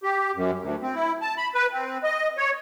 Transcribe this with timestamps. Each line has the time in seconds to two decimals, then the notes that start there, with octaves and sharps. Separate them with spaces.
0.03 G4
0.35 F#2
0.61 D2
0.82 C4
0.95 E4
1.22 A5
1.37 B5
1.55 B4
1.72 C4
2.03 D#5
2.37 C#5